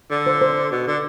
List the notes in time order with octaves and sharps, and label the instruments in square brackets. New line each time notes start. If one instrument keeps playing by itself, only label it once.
[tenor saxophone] D3
[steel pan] C5
C5
[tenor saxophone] B2
D3